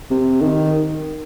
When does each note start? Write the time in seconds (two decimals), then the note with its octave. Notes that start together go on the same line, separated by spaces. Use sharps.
0.11 C3
0.41 D#3